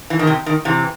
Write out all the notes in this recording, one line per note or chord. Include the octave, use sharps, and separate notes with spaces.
E3
D#3
C3
D#3
C3 E3